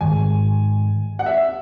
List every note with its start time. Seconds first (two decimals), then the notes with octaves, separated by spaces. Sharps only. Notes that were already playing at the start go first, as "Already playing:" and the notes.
0.01 G#2 D#3 G#3 G#5
1.19 F#5
1.26 E5